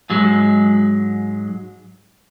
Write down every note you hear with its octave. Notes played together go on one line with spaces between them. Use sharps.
G#2 F#3 G#3